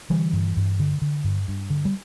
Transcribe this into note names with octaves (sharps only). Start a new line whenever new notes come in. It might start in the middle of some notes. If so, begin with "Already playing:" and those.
D3 E3 G3
G2
G2
D3
D3
G2
G2
D3
G3